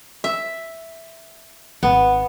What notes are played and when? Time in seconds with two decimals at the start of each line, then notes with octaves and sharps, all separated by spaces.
0.24 E5
1.83 G#1 B3